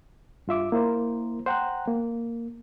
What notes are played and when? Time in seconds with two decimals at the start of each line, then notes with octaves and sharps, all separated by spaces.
0.47 G2 F4 E5 D6
0.72 A#3 E4 A#4 C5
1.46 C5 F#5 G5 A#5 F#6
1.87 A#3